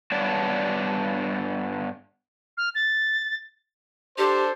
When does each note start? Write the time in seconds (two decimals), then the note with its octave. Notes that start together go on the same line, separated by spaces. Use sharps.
0.12 G2 B3 D4 C#5 D5 A5
2.57 F6
2.75 A6
4.18 D4 G4 A4 C5